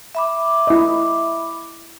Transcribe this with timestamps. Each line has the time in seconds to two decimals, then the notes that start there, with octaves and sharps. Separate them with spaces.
0.15 E5 B5 D6
0.67 E4 D#5